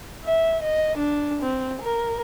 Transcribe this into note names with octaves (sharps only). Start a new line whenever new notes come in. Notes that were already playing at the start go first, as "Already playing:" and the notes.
E5
D#5
D4
C4
A#4